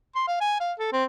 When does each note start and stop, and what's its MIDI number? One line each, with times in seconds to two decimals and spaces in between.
0.15 0.25 84
0.27 0.38 77
0.41 0.57 80
0.60 0.73 77
0.79 0.89 69
0.93 1.04 60